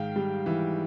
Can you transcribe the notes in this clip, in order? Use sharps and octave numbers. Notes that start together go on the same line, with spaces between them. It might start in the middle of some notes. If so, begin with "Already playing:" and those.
Already playing: G#2 D#3 F5 G5
G3
E3